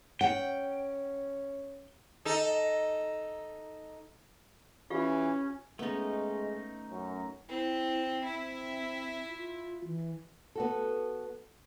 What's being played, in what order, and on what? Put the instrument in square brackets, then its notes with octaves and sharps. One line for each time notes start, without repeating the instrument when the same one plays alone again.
[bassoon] C#4 [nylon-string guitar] F#5 [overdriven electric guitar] G5
[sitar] D#4 A4
[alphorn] E3 [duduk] C#4 [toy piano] F4 G4 F5
[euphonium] G#3 [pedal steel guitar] A3 D#4 [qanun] B3 C#4
[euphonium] F#2
[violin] C4 [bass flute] E4
[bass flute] C4 [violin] E4 E5
[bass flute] F4
E3
[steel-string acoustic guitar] B3 F#4 A4